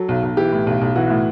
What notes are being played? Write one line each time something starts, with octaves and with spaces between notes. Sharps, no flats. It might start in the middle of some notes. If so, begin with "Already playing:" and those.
Already playing: F#3 A4
B1
B1
E3 G4
A2
B1
B1
E3 F#4
A2